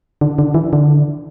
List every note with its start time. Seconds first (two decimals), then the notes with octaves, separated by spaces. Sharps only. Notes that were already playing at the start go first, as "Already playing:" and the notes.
0.21 D3
0.39 D3
0.54 E3
0.73 D3